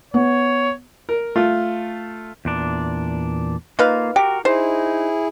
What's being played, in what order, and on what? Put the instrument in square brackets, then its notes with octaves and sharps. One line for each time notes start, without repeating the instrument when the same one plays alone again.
[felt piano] B3 [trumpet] C#5
[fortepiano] A#4
A3 F4
[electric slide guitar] E2 A#2 D4
[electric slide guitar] A#3 F4 [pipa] D#4 B4 F5
[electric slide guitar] F#4 A#4 [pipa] G4
[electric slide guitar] D#4 [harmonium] E4 G#4 [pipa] C5